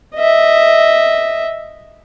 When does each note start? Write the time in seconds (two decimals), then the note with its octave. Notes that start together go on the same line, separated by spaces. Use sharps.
0.15 D#5 E5